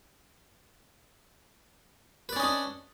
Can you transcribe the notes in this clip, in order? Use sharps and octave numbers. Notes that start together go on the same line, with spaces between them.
C#4 D4 B4 D5 D#5